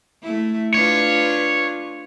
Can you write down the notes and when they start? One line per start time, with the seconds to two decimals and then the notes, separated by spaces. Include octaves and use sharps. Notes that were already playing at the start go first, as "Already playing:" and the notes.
0.22 A3 E4
0.74 D4 F4 B4 C#5